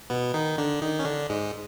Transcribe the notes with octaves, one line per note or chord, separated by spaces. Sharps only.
B2 B3
D#3 D#4
D3 D4
D#3 D#4
C#4
D3 D4
G#2 G#3